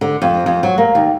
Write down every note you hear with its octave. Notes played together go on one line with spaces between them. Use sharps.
D3
F2
F2
F#3
A#3
D#2